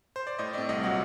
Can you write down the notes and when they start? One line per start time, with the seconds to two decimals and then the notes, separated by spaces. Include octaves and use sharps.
0.16 C5
0.27 D5
0.39 A2 D#5
0.53 A3 C4 D5
0.69 C2 D#5
0.83 A#2 F#3 F#5